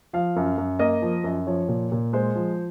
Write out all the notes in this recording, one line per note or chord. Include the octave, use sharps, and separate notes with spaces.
F3 F5
F#2
F#2
A#3 D#5
F3
F#2
F3 C#5
A#2
A#2
G#3 C5
F3